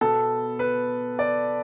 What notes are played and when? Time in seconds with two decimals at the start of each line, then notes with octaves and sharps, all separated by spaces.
0.01 B2 B3 A4
0.59 B4
1.19 D5